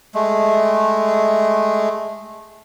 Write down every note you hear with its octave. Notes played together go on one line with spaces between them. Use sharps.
G#3 A3